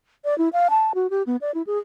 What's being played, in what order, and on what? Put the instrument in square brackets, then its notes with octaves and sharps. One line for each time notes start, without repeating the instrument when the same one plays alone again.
[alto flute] D5
E4
F5
A5
F#4
G4
B3
D5
E4
G#4